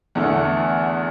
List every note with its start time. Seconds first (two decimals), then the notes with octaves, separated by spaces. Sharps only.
0.15 E2 D3 A3